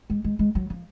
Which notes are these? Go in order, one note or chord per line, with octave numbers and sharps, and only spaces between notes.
G#3
G#3
G#3
F#3
F3